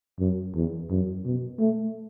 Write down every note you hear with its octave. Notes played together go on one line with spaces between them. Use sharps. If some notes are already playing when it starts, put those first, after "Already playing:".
F#2
E2
F#2
B2
A3